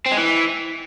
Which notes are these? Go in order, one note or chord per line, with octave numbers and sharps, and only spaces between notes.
C4
G#3
E3